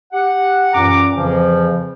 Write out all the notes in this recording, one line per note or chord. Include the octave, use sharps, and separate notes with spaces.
G4 F#5
F#2 A#2 E3 A#5 D6
F2 C#3 E3 F3